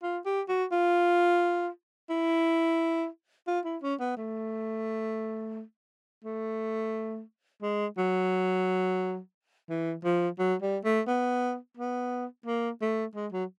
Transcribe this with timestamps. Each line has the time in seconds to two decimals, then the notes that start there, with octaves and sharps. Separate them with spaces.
0.03 F4
0.25 G4
0.49 F#4
0.72 F4
2.10 E4
3.47 F4
3.65 E4
3.82 C#4
4.00 B3
4.17 A3
6.24 A3
7.63 G#3
7.98 F#3
9.70 E3
10.05 F3
10.39 F#3
10.62 G3
10.85 A3
11.08 B3
11.77 B3
12.46 A#3
12.81 A3
13.15 G#3
13.32 F#3